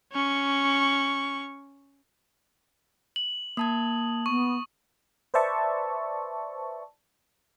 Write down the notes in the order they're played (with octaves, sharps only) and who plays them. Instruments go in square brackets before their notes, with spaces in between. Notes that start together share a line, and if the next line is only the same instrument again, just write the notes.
[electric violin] C#4 C#6
[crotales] F#7
[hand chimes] A#3 A5 G#6 [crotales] D#6
[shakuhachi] B3 [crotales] C#6
[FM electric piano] B4 C5 D5 E5 A5 C#6